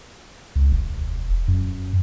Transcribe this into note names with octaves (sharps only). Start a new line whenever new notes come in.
C#2
E1
F#2